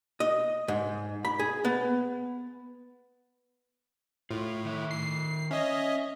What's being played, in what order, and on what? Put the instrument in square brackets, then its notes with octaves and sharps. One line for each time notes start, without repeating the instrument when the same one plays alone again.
[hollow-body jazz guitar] D#5
G#2
B5
G#4
B3
[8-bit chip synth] A2 [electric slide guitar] F4
[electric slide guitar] D#3 E5
[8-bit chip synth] C7
[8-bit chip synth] C#4 D#5 [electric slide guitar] E5